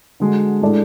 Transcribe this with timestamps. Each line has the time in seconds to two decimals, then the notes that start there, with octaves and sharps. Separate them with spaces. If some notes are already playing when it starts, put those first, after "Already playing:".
0.20 D3 G#3 D4 F#4
0.62 A2 G#3 D4 A4 D5